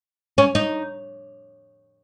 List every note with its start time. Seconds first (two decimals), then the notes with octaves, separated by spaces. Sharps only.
0.38 C#4
0.55 D#4